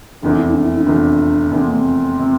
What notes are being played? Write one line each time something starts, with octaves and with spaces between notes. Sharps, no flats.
F1 E2 C3 D4
E4
D4
E4
D4
F1 E2 C3
F1 E2 C3 D4
C4
A#3
C4
C3